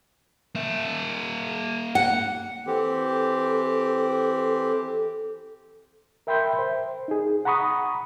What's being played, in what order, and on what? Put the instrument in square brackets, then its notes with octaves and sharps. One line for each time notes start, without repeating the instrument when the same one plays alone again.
[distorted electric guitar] A#3 E5
[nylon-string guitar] F#5
[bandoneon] E3 C4 G4 [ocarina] A4
[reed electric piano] A#4 E5 G5 B5 C6 G6
C5
D#4 G#4
F#5 A#5 B5 C#6 D#6